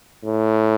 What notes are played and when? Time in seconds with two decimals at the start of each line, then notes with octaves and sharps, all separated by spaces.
0.23 A2